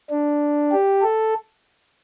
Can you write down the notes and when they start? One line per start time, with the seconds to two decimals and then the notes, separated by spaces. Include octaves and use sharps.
0.10 D4
0.72 G4
1.02 A4